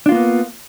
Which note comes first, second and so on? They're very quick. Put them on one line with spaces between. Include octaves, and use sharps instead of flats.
D4 F4 A#3 B3